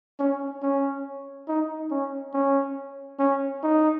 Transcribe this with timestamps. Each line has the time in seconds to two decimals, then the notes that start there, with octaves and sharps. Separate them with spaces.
0.19 C#4
0.63 C#4
1.48 D#4
1.91 C#4
2.34 C#4
3.20 C#4
3.63 D#4